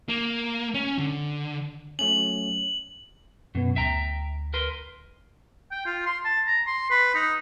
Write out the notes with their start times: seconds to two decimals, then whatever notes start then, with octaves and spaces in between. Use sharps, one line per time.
0.09 A#3
0.74 C#4
0.99 D3
1.99 F#3 A3 C#4 F#7
3.55 F#2 B2 B3
3.76 D2 E5 G5 A#5
4.54 A#4 B4 C6
5.71 G5
5.86 F4
6.06 C6
6.25 A5
6.47 A#5
6.67 C6
6.90 B4
7.14 D#4